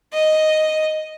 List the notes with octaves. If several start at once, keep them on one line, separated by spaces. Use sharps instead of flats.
D#5